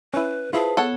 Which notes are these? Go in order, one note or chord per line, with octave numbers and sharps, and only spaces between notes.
C#4 E4 B4
E4 F4 G#4 B4 C5 A5
B3 A4 C#5 F#5